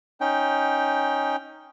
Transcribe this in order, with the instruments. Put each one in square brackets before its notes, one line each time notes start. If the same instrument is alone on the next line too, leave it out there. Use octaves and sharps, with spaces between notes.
[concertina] C#4 D#4 G5